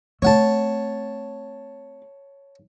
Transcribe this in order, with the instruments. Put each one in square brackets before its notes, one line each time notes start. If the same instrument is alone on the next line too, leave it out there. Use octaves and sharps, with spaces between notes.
[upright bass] A3 C4 [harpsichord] C#5 F#5 A5